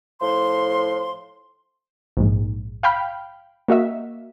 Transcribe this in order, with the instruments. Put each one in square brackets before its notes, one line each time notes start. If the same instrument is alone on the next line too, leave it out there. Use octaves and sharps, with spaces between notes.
[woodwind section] A2 F3 C6
[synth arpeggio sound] A#1 G#2
F5 G5 B5 F6
A#3 F#4 D#5 E5